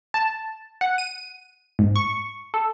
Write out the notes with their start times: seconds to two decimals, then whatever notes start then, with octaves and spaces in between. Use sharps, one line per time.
0.14 A5
0.81 F#5
0.98 D#7
1.79 G#2
1.96 C#6
2.54 A4